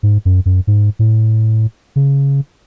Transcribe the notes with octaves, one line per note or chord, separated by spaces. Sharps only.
G#2
F#2
F#2
G#2
A2
C#3